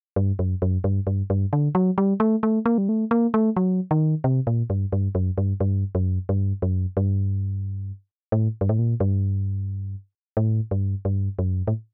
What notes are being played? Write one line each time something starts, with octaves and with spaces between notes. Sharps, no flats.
G2
F#2
F#2
G2
G2
G2
D3
F#3
G3
A3
A3
A#3
G3
A3
A#3
A3
F#3
D#3
C3
A#2
G2
G2
F#2
G2
G2
F#2
G2
F#2
G2
A2
G2
A2
A#2
G2
A2
G2
G2
F#2
A2